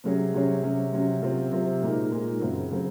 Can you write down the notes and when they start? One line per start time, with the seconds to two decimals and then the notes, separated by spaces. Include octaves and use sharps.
0.04 C3 F#3 C#4 G#4 C#5
0.34 C3 F#3 C#4 G#4 C#5
0.63 C3 F#3 C#4
0.92 C3 F#3 C#4
1.22 C3 F#3 C4 F4
1.52 C3 F#3 C4 F4
1.82 A#2 G#3 D#4 A#4
2.11 A#2 G#3 D#4 A#4
2.40 F#2 C#3 F#3 C4
2.71 C#3 F#3 C4